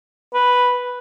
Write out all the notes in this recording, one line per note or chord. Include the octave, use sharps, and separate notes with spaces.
B4